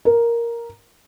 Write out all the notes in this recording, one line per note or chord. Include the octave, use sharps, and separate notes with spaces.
A#4